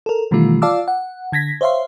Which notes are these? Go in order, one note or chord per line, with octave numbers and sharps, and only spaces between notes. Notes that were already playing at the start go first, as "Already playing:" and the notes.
A4 A#4
B2 D#3 E3 G3 A3 F4
F4 D5 F5 A5 D6 E6
F#5
D3 G#6 A#6 B6
C5 C#5 E5 F5 C6